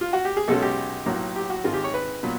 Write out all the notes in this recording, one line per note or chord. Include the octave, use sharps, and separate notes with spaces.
F4
F#4
G4
G#4
B1 B2 G#3 C#4 A4
G4
B1 A2 F#3 A#3
G4
F#4
G#1 G#2 D#3 G#3 C4 F4
G4
C#5
B4
A#2 F#3 B3